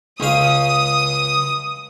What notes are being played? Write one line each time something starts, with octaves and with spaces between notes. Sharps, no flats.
C#2 F5 D#6